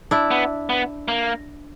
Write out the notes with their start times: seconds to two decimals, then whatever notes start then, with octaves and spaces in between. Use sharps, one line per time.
0.11 D4 E4
0.31 B3
0.70 B3
1.08 A#3